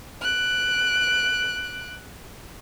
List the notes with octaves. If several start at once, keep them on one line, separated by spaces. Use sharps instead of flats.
F#6 D7